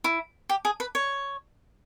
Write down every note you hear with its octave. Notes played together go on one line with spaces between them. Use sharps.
E4
G4
G#4
B4
C#5